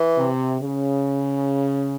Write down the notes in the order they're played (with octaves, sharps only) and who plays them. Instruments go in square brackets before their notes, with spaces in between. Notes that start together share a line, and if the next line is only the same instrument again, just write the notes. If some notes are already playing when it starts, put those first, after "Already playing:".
Already playing: [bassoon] E3
[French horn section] C3
C#3